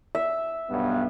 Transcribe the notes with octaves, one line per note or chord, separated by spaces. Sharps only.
E5
B1 G2 B3